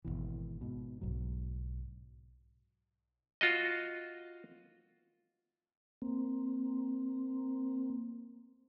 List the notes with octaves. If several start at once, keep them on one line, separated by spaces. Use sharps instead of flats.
G#1 C#2 B2 E3
G#2 B2
B1 G#2 F#3
F4 F#4 D#5
A#3 C4